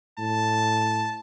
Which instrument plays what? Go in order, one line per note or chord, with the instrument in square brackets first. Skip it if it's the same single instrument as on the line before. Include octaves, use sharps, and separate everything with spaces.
[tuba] A2 [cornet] A5